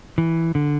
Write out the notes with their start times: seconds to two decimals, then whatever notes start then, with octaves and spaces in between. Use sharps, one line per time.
0.18 E3
0.55 D3